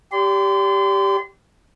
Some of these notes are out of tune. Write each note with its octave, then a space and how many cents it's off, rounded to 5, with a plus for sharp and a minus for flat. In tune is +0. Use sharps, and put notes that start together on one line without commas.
G4 +0 D5 -30 C6 -35